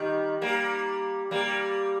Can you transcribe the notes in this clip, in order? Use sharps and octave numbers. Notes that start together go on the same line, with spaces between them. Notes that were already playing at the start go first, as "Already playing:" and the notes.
Already playing: D#3 G3
G3 A#3
G3 A#3